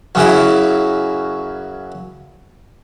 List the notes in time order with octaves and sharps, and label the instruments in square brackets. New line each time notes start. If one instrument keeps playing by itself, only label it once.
[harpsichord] F#2 C#3 F#3 E4